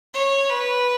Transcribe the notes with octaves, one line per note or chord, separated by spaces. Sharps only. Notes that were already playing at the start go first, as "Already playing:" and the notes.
C#5
B4